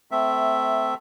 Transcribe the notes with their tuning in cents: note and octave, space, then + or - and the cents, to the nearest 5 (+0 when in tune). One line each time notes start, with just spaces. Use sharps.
A3 -10 C4 -30 E5 +0